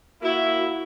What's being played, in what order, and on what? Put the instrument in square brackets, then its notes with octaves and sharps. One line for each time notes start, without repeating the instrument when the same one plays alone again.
[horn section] A#3 E4 [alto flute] F#4